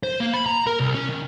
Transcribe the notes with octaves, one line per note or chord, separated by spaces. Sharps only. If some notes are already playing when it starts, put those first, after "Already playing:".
C5
A#3
B5
A#5
A#4
C2
C#4
D#3